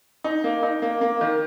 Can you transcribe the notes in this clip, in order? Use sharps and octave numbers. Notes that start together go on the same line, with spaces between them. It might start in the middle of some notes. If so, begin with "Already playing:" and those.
D#4
A#3
D#4
A#3
A#3
D#3